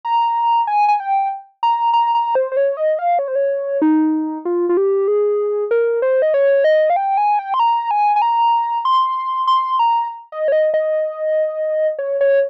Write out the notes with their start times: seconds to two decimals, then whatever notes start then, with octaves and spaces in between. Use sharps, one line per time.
0.05 A#5
0.67 G#5
0.88 G#5
1.00 G5
1.63 A#5
1.93 A#5
2.15 A#5
2.35 C5
2.52 C5
2.57 C#5
2.77 D#5
2.99 F5
3.19 C#5
3.28 C5
3.35 C#5
3.82 D#4
4.45 F4
4.69 F4
4.77 G4
5.08 G#4
5.71 A#4
6.02 C5
6.22 D#5
6.34 C#5
6.64 D#5
6.90 F5
6.96 G5
7.17 G#5
7.39 G5
7.54 C6
7.59 A#5
7.91 G#5
8.16 G#5
8.22 A#5
8.85 C6
9.47 C6
9.79 A#5
10.32 D#5
10.48 C#5
10.52 D#5
10.74 D#5
11.99 C#5
12.21 C#5